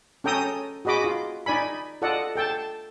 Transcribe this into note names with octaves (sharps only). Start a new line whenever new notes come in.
C#4 A4 G5 A#5 D#6
F#4 G#4 D#5 B5 D6
F4
D#4 D5 G#5 B5
F4 A4 D5 D#5 F#5
A4 G5 A5